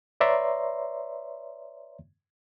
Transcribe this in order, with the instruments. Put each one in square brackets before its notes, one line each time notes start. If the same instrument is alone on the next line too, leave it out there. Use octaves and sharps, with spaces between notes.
[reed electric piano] B4 C#5 D5 E5 A#5 C6